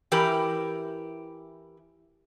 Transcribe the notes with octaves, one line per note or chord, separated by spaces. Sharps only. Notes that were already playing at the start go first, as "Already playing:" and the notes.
E3 E4 G4 A#4